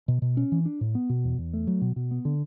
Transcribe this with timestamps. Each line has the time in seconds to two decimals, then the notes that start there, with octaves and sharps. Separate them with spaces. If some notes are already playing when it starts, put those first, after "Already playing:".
0.08 B2
0.22 B2
0.37 C#4
0.52 E3
0.66 D4
0.81 A2
0.95 B3
1.09 B2
1.24 E2
1.38 E2
1.53 A3
1.67 F#3
1.82 B2
1.96 B2
2.11 B3
2.25 D3